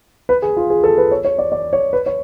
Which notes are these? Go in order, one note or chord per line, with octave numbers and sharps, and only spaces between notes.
B4
G#4
F4
G#4
A4
B4
C#5
C#5
D5
D5
C#5
B4
C#5